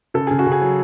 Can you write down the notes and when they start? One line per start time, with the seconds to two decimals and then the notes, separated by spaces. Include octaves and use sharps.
0.14 C#3 A4
0.27 C#3 G#4
0.39 F#4
0.47 C#3
0.52 G#4
0.61 F#3